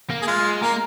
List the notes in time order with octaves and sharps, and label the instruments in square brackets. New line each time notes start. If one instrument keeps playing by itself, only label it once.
[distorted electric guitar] A#3
[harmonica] G#4
[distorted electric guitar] G#3 [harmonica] F4
[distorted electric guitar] A#3 [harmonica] A#4